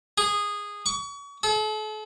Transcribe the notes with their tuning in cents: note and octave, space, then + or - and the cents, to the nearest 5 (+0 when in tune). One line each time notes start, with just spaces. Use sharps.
G#4 -10
C#6 +35
A4 -40